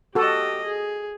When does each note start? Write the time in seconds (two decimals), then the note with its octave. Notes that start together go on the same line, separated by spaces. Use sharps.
0.15 F#4 G4 A4 D#5
0.65 G#4